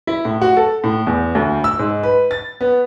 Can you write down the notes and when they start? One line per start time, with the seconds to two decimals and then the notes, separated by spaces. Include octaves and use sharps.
0.07 E4
0.25 A2
0.41 F#4
0.57 A4
0.84 A2
1.07 E2
1.35 D2
1.64 E6
1.79 G#2
2.03 B4
2.31 A6
2.61 B3